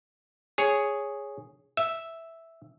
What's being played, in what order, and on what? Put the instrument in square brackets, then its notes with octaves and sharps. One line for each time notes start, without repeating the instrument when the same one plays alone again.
[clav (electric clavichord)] G#4 C#5
E5